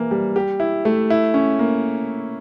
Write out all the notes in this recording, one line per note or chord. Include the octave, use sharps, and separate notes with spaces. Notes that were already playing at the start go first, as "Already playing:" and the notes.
Already playing: E3 A#3
G3
G4
E4
A3
E4
C#4
A#3